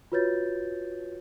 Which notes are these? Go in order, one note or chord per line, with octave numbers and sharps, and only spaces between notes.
F4 F#4 B4 C#5 G6 A6